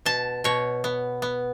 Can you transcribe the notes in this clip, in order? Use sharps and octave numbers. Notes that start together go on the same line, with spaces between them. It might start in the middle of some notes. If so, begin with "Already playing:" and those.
B2 A5
B2 C#5
B3
B3